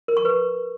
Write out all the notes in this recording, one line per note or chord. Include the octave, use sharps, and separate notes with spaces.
A#4
C#6
B4